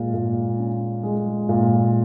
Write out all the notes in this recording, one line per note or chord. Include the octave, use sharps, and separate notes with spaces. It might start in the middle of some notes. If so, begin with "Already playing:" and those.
Already playing: A#2 G#3
A#2
C#4
G#3
A#2